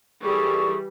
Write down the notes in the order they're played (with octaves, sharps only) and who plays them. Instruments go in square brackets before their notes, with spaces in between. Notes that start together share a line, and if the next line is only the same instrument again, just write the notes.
[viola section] E3 G3 [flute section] G#4 A4 C#6